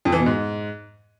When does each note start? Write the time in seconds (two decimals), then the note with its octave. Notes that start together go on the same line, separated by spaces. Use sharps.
0.05 F2
0.12 E3
0.19 B2
0.26 G#2